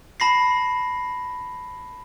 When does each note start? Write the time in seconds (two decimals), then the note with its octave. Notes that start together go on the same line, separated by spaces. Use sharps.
0.20 A5 B5 A#6 C7